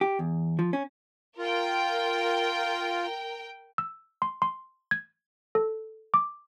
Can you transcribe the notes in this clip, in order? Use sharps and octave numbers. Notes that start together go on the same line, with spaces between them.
G4
E2
F3
C#4
F4 A#4 G5
E6
C6
C6
G#6
A4
D6